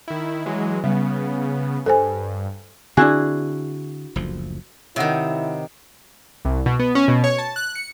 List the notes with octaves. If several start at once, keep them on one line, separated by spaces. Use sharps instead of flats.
D#3 E4
E3 F#3 G#3
C#3 G3 B3
G2 A4 C5 G#5
D3 C4 D4 E4 F#4 G#4
F#1 D2 F3
C3 D#3 E4 C#5 D#5 F#5
C2
B2
B3
C#4
B2
C#5
A5
F#6
C#7